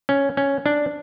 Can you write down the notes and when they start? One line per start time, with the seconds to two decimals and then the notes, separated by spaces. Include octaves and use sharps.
0.09 C#4
0.37 C#4
0.66 D4